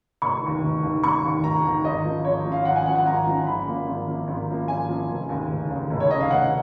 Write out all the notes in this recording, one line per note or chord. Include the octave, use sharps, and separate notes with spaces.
F1 C#6
D#2 D#3
F1
D#2 D#3
F1 C#6
D#2 D#3
F1 A#5
D#2 D#3
G#1 D#5
F#2 F3
G#1 C#5
F#2 F3
F5
G#1 F#5
G#5
F#2 F3 F#5
F#5
G#1 A#5
F#2 F3
G#1 B5
F#2 F3 A#3
G#1
F#2 F3 A#3
G#1
F#2 F3 A#3
G#1 G#5
F#2 F3 A#3
F1
D#2 C#3
F1
D#2 C#3
F1
C#5
D#2 C#3 D#5
F5
F1 F#5